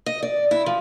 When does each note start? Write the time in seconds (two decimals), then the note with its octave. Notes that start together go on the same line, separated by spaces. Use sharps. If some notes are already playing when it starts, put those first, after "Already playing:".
0.06 D#5
0.23 D5
0.51 E4
0.66 F3